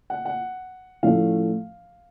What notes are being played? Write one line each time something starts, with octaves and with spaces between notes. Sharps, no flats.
F#5
F#5
A2 F3 A3 C#4 F5